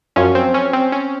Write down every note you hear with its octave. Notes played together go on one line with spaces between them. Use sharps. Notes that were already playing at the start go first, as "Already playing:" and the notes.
F#2 F3 C#4
C4
C#4
C4
C#4